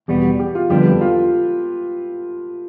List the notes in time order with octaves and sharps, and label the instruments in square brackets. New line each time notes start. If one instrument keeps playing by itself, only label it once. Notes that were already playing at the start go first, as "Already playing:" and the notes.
[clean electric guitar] E2 B2 G3 B3 [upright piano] G4
[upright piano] G4
F4
[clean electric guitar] F2 D3 G3 B3 D4 [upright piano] G4
[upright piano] B4
A4
F4